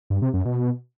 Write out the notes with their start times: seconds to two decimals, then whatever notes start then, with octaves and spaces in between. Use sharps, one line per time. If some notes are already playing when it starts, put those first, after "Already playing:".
0.10 G2
0.22 C3
0.34 F#2
0.45 B2